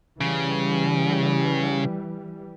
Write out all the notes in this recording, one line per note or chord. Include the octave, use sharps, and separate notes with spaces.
C#3 E3 G3